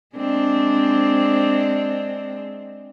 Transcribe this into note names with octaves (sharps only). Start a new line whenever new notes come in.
G#3 C4 D4